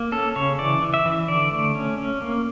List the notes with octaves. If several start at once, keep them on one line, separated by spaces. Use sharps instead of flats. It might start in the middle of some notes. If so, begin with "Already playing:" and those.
Already playing: A#3
C#4 A4
C#3 C#5
E3 D5
E3
E5
E3
D3 D5
A3
C#4
C#4
A#3